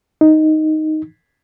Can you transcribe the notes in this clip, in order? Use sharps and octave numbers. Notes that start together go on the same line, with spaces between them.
D#4